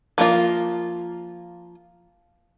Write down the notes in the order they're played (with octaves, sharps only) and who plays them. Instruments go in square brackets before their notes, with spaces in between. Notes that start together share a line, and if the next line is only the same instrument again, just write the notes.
[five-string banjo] F3 A#3 F4